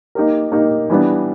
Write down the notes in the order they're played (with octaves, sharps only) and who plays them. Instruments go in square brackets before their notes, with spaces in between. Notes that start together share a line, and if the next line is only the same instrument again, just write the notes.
[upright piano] A#3 D#4 G4 A#4
A#3 D#4 G4 A#4
E3 G3 B3 D4